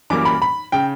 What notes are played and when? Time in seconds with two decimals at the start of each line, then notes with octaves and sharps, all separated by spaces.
0.10 F#2 E3 G3 A#3 D6
0.25 B5
0.42 B5
0.72 C#3 G5